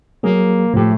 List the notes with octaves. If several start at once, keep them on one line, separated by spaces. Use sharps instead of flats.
F#3 A#3 G#4
A2 F3 A3 G4